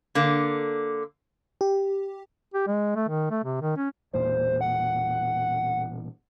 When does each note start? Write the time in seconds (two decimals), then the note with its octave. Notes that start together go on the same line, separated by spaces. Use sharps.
0.15 D3 A#3
1.61 G4
2.54 G4
2.67 G#3
2.96 A3
3.08 D#3
3.31 A3
3.44 C3
3.61 D#3
3.77 C#4
4.13 E1 E2 A#2 C5
4.61 F#5